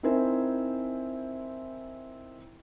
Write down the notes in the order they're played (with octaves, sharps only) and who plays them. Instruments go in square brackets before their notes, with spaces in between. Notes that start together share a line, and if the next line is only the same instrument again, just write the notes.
[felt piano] C4 D#4 E4 A#4 C5 G#5